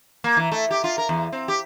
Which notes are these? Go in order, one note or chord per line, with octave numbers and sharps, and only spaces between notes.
A#3
E3
A3
G4
F4
A#4
E2
C4
G4